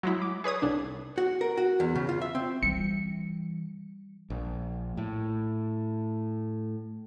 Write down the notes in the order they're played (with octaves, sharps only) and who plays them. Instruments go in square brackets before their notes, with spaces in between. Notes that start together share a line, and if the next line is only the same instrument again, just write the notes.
[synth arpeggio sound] F#3 G#3 E4
D6
G#4 B4 C#5 D#6
C2 D4
[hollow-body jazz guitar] F#4
A#4
F#4
E2
C#3
F4
E5
C4
[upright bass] E3 [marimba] G3 [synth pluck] C#7
[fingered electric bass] A#1
A2